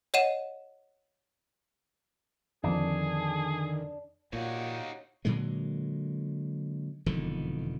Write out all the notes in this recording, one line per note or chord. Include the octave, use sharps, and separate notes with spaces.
C#5 D#5 F#5 D#7 E7
F2 D3 D#3 F3 C4 D4 G#4
A#2 D#4 F#4 G4 C#5 F5
A#2 D3 F#3 G#3
E1 F2 D3 D#3